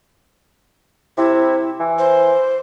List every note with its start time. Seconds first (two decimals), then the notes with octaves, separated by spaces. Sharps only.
1.17 C3 E4
1.80 E3
1.99 C5